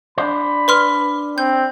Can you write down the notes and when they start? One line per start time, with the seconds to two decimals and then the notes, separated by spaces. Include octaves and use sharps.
0.18 D4 C5 B5
0.68 B4 C6 F6
1.38 C4 G6